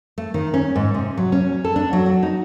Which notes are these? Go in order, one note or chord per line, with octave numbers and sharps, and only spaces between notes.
A3
D#3
C#4
G#2
C3
F#3
C#4
A4
D4
F#3
F#4
D#4